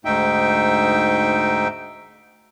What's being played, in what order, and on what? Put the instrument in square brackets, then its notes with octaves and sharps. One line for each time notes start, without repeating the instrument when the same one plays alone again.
[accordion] D2 G#2 D#4 E5 G5